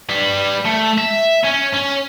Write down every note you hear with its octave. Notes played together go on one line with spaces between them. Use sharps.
G3 B4
A3
E5
C#4
C#4